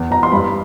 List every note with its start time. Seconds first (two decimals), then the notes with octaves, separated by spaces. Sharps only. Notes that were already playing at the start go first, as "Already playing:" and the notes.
Already playing: E2
0.11 E2 A#5
0.23 C6
0.32 G2 B5